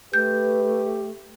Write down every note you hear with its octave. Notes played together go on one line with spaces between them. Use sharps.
A3 G4 B4 G6